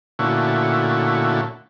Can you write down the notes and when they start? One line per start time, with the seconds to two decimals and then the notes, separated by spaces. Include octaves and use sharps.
0.19 A#2 D3 A3 C#4 E4 F#4